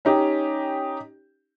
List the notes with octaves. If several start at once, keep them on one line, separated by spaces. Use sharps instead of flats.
C#4 D#4 G4